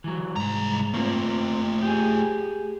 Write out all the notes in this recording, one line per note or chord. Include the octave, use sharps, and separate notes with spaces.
E3 F#3
C2 G#2 A#5
A3 A#3 C4 F4
G4 G#4